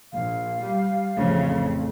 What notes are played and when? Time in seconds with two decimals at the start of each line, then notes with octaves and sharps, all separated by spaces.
0.13 A#1 F5
0.61 G3
1.17 A1 F2 C#3 F3 A3